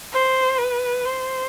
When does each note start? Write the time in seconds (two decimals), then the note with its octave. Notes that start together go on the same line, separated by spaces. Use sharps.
0.12 C5
0.58 B4
1.05 C5